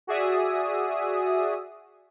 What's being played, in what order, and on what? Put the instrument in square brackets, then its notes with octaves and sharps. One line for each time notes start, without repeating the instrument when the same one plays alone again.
[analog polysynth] F#4 G#4 D5 E5 D#6